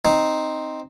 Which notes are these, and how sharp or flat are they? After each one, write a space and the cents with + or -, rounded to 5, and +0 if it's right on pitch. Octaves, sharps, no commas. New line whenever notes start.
C4 +0 D#4 +0